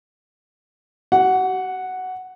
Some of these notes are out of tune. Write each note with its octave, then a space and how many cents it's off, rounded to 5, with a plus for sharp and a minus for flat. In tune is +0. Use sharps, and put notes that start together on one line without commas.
F#4 +45 F#5 +0